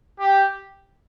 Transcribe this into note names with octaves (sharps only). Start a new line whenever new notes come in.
G4